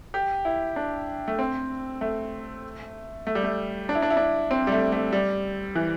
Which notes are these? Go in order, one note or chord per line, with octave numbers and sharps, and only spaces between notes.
G4
E4
D4
A3
C4
A3
A3
G3
A3
D4
E4
D4
E4
D4
C4
G3
A3
A3
G3
E3